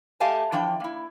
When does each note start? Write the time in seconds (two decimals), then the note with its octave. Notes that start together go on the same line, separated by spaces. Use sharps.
0.20 A3 G4 D#5 F5 G#5 A5
0.52 E3 F3 D4 G5
0.80 A#3 E4